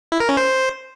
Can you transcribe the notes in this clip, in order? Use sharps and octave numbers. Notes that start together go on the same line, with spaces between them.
E4
A#4
C#4
C5